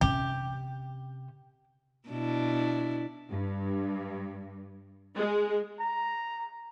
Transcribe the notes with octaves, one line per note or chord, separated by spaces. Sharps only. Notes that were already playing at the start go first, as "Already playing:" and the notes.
C3 C#4 G4
B2 D4 E4
G2
G#3
A#5